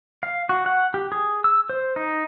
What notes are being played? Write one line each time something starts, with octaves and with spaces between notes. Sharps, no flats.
F5
F#4
F#5
G4
G#4
E6
C5
D#4